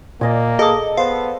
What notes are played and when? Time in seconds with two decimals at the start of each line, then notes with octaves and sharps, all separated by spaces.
0.21 A#2 A#3 D5 D#5 G#5
0.59 G#4 A4 D#5 D#6
0.97 B3 C5 F5